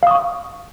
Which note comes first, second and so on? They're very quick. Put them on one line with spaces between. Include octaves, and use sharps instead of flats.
F5 D#6 C#6